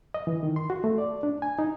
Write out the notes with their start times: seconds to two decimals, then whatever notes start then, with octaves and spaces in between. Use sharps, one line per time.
0.14 D#5
0.27 E3
0.43 D#3
0.56 C6
0.70 F#4
0.84 A3
0.98 D5
1.23 D4
1.42 G#5
1.59 D#4